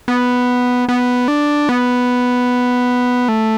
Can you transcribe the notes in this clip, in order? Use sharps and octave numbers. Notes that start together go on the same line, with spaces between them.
B3
B3
D4
B3
A3